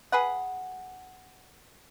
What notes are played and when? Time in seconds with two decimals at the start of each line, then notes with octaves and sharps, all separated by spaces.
0.12 G#4 B4 F#5